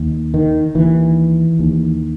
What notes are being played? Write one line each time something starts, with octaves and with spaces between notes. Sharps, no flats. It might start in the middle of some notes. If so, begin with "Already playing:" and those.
Already playing: D#2
D#3
D#2 E3
D#2